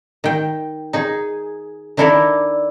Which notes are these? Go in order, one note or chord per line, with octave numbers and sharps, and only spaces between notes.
D#3 G5
D#4 G#4
D#3 D4 E4 A4 A#4 D5